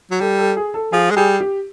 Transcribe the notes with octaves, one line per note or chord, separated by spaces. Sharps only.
F#3
G3 A4
A4
G#4
A4
F3 G#4
G#3
G3 G#4
G4